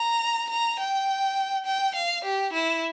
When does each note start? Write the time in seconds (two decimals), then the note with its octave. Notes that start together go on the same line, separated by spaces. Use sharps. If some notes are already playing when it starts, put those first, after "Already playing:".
Already playing: A#5
0.50 A#5
0.79 G5
1.66 G5
1.95 F5
2.24 G4
2.53 E4